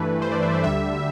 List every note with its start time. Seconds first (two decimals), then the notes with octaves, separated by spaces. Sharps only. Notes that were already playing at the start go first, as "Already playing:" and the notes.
Already playing: G2 E3 A3 B4
0.22 C5
0.32 D5
0.43 E5
0.53 D5
0.64 D2 D3 G3 E5